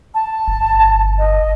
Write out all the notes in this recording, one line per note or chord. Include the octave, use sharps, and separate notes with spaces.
A5
G1
D#5